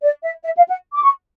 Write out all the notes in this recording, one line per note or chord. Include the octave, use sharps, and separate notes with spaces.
D5
E5
E5
F5
F#5
D6
C#6